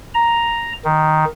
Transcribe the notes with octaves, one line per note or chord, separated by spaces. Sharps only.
A#5
D#3